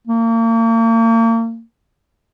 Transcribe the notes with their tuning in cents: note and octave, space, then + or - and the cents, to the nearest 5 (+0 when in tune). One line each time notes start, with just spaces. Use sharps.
A#3 -40